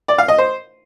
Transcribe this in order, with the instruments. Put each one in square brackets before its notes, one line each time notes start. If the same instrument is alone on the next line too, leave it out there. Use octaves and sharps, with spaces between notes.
[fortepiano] D5
F5
D#5
C5